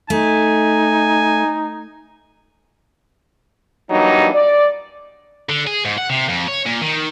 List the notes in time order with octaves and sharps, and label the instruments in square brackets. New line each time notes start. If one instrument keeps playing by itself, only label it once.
[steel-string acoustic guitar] A3 [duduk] D#4 [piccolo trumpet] G#5
[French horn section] E3 F#3 G3 A#3 D4 D#4
D5
[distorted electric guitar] D3
G#4
G#2
F#5
C3
F2
C#5
A#2
D#3